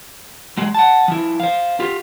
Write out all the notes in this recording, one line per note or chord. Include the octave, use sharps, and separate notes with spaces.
F#3 G#3
F#5 A5
F3 E4
C5 F5
F4 G4